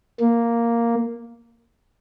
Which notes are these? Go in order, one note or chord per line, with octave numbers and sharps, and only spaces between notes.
A#3